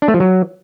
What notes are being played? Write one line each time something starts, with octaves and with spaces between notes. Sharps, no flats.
D4
A3
F3
F#3